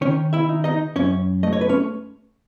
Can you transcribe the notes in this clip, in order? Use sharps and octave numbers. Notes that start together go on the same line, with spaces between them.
D#3 C#4 C#5
E4 E5
D#4
D#4 D#5
F#2 C#4 C#5
A3 D#5
C#5
B4
C#4 C#5